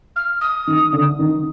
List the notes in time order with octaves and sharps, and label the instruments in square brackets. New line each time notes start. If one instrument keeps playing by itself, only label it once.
[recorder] F6
D#6
[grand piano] D#3
D3
D#3